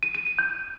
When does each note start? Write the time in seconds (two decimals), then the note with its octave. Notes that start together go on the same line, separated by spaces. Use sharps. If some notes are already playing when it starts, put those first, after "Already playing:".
0.03 D#7
0.15 D#7
0.27 D#7
0.39 G6